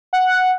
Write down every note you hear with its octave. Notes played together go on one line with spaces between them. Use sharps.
F#5